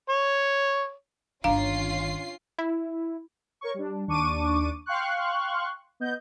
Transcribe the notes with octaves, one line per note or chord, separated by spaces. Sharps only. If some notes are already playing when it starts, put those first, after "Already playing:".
C#5
G1 D#3 C#4 D4 F4 F5 A#5 C7
E4
A#4 C#5 C#6
G3 D4
D#2 D4 C#6 D6 D#7
F5 G5 C6 C#6 F#6
B3 D#5 G6